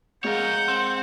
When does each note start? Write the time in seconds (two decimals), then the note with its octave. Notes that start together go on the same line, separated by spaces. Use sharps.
0.24 G#3 A#4 C#5 F5 F#5 G6
0.69 C4